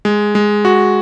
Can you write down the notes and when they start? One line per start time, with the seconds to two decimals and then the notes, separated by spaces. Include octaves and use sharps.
0.05 G#3
0.35 G#3
0.65 F#4